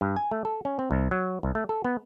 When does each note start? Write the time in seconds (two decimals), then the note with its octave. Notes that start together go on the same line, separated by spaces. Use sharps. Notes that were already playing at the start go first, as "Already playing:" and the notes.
0.01 G2
0.16 G#5
0.31 A3
0.45 A4
0.65 C#4
0.79 C4
0.91 C2
1.11 F#3
1.43 C2
1.55 A3
1.69 A4
1.84 B3